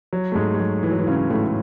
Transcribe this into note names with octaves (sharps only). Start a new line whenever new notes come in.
F#3
A3
G#2 G#3
G#3
F#3
E3
F#3
E3
C#3 C#4
A2 A3
A3